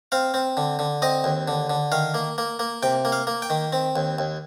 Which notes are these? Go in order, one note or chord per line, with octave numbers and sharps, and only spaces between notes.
C4 F5
C4
D3
D3
C4 D#5
D#2
D3
D3
D#3 F5
A#3
A#3
A#3
C3 G5
A#3
F5
A#3
G5
D#3
C4
D#2
D#2